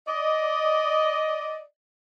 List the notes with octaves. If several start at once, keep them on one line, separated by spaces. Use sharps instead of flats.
D5 D#5